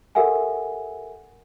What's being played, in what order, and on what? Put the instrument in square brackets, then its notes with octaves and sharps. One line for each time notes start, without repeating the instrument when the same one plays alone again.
[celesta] G4 A4 A#4 E5 F#5 G#5